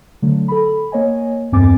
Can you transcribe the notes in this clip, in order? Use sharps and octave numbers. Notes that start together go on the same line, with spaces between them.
D3 F#3 A3
A4 B5
A#3 C#5 D#5 G#5
E2 G2 C4 G#5 D6 A6